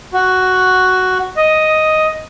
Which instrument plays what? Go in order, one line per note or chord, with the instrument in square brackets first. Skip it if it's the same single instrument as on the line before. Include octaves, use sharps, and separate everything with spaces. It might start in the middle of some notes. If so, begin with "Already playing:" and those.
[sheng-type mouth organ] F#4
D#5